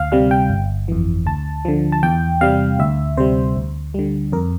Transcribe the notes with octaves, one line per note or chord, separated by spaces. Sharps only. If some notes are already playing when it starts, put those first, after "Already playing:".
Already playing: D2 F5
C3 G3 F5
G5
G1
F2 E3
D2 A5
D3 F3
A5
E2 G5
C3 G3 F5
D2 E5
C3 G3 C5
D2
D3 G3
F2 A#4